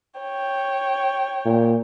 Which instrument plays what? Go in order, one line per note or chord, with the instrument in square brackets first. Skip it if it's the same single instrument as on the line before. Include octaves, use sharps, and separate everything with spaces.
[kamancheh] C#5 G5
[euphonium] A#2